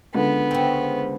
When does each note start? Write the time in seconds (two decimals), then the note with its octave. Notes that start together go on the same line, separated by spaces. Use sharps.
0.15 C#2 D3 B3
0.51 C#3 C4